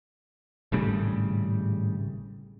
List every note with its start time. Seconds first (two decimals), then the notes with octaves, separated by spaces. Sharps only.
0.72 G#1 A2 C#3 G3